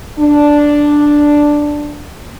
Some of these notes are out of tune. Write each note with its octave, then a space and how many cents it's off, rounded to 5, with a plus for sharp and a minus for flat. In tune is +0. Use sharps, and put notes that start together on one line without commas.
D4 +0